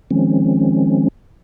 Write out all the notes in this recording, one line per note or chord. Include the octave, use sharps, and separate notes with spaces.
D#3 F3 G#3 C4 C#4